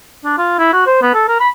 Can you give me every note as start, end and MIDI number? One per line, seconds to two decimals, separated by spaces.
0.24 0.35 62
0.38 0.57 65
0.58 0.68 64
0.73 0.86 66
0.86 0.99 72
1.02 1.10 59
1.14 1.25 69
1.28 1.36 70
1.40 1.48 83